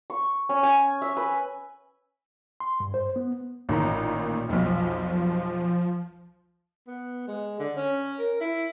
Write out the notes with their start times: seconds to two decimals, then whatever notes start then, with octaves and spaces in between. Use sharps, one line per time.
0.10 C#6
0.49 C#4
0.63 G#5
1.02 E5
1.17 B4
2.60 C6
2.80 G2
2.94 C5
3.16 B3
3.69 A1 A#2 D#3 A#5
4.49 F1 B1 F3
6.87 B3
7.28 G#3
7.60 D3
7.77 C#4
8.19 A#4
8.41 E4